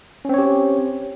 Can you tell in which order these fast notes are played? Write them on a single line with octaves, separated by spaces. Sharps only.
C#4 C4 C#5 G4